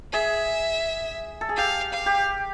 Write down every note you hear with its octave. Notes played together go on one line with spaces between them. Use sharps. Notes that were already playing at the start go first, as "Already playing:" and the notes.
G#4 E5
A4
G#4
G4 F5
F5
G4